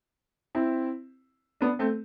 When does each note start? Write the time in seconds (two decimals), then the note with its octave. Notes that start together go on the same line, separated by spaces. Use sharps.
0.55 C4 E4
1.61 B3 D4
1.79 A3 C4